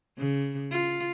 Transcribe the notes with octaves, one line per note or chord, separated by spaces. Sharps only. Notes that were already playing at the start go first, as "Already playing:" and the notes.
C#3
F4